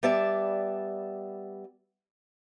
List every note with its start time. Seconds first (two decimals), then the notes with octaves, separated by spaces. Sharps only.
0.03 G3 B3 D5 E5 A5